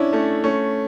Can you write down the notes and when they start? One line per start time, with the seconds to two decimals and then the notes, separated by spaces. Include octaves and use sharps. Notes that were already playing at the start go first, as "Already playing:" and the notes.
Already playing: C#4 D4 E4
0.13 A3 C#4
0.44 A3 C#4